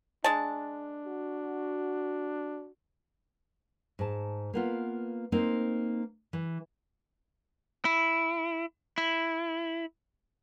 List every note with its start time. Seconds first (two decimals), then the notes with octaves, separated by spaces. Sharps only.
0.24 G#3 D4 A5
1.06 F#4
3.99 G#2 A5
4.54 A#3 B3 F4
5.32 A#3 C4 D#4 C5
6.33 E3
7.85 E4
8.98 E4